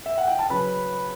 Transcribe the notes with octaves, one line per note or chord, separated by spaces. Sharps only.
E5
F#5
G5
A5
C#3 F#3 C#4 B4 B5